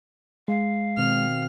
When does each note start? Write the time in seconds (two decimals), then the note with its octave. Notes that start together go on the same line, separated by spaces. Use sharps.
0.48 G#3 F5
0.97 B2 D#3 C4 F6